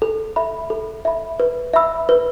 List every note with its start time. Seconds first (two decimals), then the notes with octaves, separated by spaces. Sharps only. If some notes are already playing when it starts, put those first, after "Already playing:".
0.02 A4
0.36 E5 B5
0.70 A4
1.05 E5 B5
1.40 B4
1.74 E5 B5 E6
2.09 B4